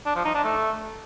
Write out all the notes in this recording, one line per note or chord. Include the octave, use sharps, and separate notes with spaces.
D4
F3
D#4
D4
A3